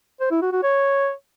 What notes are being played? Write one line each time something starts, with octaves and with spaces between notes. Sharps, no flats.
C5
E4
F#4
F#4
C#5